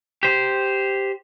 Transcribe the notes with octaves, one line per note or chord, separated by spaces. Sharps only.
G4 C5